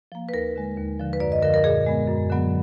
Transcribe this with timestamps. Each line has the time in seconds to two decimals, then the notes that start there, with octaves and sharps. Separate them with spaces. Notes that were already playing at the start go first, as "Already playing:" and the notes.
0.12 F3 A#3
0.29 B4
0.33 D#2 A#4
0.56 D3 G#3
0.77 D#2
0.99 D3 F3
1.13 B4
1.20 F#2 D5
1.32 D#5
1.43 D3 F3 A#4
1.54 A#4
1.64 A#2 G#4
1.86 G#3 B3
2.08 F#2
2.30 D3 F#3 B3